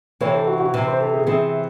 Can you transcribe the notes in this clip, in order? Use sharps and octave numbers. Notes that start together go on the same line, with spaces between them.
C3 E3 C4 C#5
A4
F#4
F#4
C3 E3 C4
C5
A4
G#4
C3 E3 C4 G#4